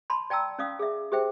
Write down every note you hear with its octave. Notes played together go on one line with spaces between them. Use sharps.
A5 B5 C6
D5 G5 A5 A#5 E6
C#4 D5 F5 D#6
G#4 E5
G4 G#4 C5 E5 G5